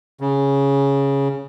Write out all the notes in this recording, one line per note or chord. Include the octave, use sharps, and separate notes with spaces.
C#3